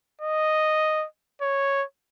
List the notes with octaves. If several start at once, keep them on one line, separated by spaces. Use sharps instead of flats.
D#5
C#5